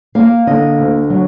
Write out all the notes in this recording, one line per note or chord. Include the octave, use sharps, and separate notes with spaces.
A#3 F5
D3 D#5
D2
F#3